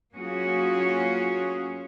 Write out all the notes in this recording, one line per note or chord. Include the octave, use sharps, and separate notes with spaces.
F#3 A#3 C#4 F4 F#4 G#4